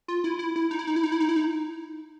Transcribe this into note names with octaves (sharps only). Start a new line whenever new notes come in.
F4
E4
E4
E4
D#4
E4
D#4
E4
D#4
E4
D#4
E4
D#4